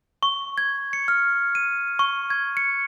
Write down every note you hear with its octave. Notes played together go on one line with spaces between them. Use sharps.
C#6
G#6
C#7
F6
D#7
C#6
G#6
C#7